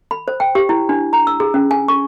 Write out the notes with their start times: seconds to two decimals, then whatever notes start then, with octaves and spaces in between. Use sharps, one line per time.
0.11 B5
0.28 C5
0.40 G5
0.55 G4
0.69 E4
0.89 D4
1.13 A#5
1.27 E6
1.40 G#4
1.54 C#4
1.71 G#5
1.88 C#6